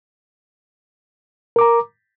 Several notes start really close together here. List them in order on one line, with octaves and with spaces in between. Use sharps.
A#4 D6 A#5